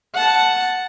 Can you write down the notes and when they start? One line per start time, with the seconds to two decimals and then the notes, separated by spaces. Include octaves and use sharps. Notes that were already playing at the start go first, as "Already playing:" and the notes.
0.14 F#5 A5